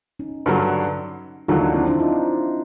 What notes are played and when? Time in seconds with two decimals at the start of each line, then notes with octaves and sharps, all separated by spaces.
0.19 C#4 D#4
0.46 G2 D3 F#3
1.48 D#2 D3 F#3 D#4 F4
1.61 D4 E4
1.74 C4 D4
1.87 D4 E4
1.99 D#4 F4